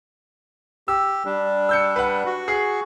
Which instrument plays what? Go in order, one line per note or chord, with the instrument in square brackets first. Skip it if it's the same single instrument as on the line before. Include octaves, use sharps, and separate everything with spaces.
[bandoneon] G4 [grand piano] E6
[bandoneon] G3 D4
[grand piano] E6 G6 C#7
B4 F#5
[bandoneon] F#4
[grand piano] G#4